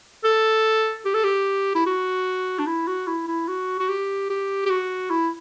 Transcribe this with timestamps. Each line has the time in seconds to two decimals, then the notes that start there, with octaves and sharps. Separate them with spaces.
0.24 A4
1.05 G4
1.14 A4
1.24 G4
1.75 E4
1.86 F#4
2.59 D4
2.67 E4
2.87 F#4
3.07 E4
3.28 E4
3.48 F#4
3.79 F#4
3.89 G4
4.30 G4
4.66 G4
4.70 F#4
5.10 E4